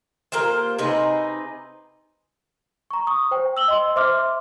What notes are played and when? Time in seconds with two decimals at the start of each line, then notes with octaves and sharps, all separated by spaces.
0.32 A#3 F4 G4 C5
0.79 C3 D#4 G#4 B4
2.91 A#5 C#6
3.07 C#6 D#6
3.31 C5 G5
3.57 E6 F#7 G7
3.68 D#5 C6
3.96 C5 E5 C6 D6 F6